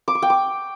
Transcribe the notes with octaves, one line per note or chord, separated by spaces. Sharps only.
D6
C#6
G5
D6